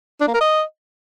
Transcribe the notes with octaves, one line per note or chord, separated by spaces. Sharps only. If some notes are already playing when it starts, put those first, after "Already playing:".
D4
A#3
A#4
D#5